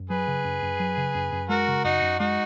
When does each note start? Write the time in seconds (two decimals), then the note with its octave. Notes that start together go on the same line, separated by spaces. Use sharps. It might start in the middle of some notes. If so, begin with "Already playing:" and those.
Already playing: F#2
0.10 F#3 G#4 B4
0.28 C#3
0.45 F#2
0.62 F#2
0.80 F#3
0.97 C#3
1.15 F#2
1.32 F#2
1.49 G#3 F#4 A#4
1.68 C#3
1.84 F#2 D#4 F#4
2.02 F#2
2.19 G#3 D#4 F#4